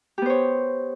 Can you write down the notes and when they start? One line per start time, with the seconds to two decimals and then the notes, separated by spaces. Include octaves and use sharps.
0.18 G4
0.22 B3
0.26 C5
0.30 C#5